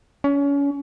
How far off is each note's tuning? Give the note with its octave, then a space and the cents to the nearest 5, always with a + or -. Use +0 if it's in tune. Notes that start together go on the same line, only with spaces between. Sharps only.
C#4 +30